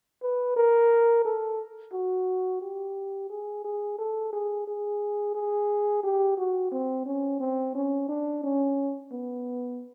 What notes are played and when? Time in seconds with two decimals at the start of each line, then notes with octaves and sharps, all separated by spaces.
0.23 B4
0.56 A#4
1.25 A4
1.93 F#4
2.61 G4
3.30 G#4
3.64 G#4
3.98 A4
4.33 G#4
4.67 G#4
5.35 G#4
6.04 G4
6.38 F#4
6.72 C4
7.06 C#4
7.40 C4
7.75 C#4
8.08 D4
8.43 C#4
9.12 B3